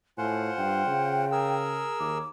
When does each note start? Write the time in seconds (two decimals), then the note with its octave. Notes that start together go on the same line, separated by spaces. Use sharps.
0.18 A2 F4 C5 F#5 G#5
0.58 G2 G5
0.87 C#3
1.32 G#4 A#4 E6
2.00 D#2 D6